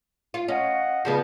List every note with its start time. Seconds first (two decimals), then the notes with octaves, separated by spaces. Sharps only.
0.34 F4
0.48 C#4 D#5 F5 F#5
1.05 C#3 F3 G3 B3